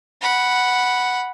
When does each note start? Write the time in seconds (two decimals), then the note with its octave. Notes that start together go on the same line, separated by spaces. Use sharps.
0.22 F#5 B5